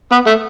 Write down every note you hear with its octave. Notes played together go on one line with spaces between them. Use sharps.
B3
A3